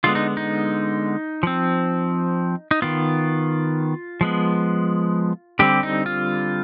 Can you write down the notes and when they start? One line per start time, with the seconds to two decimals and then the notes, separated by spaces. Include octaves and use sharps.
0.04 D3 G#3 B3 F4
0.15 D#4
0.37 D#4
1.43 F3 C4
2.71 D#4
2.82 D#3 B3 F4
4.21 F3 G#3 B3
5.59 D3 G3 C4 G4
5.83 D#4
6.06 F4